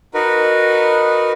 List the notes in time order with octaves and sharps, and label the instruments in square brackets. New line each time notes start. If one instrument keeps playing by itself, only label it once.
[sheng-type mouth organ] D#4 F#4 A#4 B4